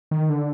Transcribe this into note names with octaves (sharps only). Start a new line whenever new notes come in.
D#3
D3